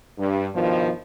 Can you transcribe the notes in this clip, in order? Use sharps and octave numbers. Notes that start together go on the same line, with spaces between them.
G2
G2 B2 D#3 F3